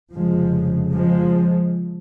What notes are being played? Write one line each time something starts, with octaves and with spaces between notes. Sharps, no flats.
F1 F2 C#3 F3 G#3
F3 G#3